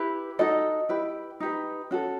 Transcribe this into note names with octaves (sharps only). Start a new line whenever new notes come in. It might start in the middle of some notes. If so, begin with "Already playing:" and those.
Already playing: E4 G4 B4
D#4 F#4 A4 D#5
E4 G4 B4
D#4 G4 B4
C#4 F#4 A4